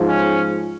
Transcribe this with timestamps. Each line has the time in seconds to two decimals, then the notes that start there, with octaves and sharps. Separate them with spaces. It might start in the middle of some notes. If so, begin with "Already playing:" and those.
Already playing: G#2 F3
0.08 C#4